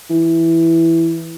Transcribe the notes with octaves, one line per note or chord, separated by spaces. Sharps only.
E3